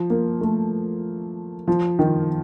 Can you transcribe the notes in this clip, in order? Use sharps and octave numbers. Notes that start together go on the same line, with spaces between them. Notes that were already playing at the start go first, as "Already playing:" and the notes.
Already playing: F3
A#3
A3
F3
D#3